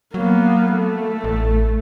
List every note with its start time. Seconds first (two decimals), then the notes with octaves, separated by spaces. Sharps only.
0.14 F#3 A#3 B3
0.73 A3
1.24 A1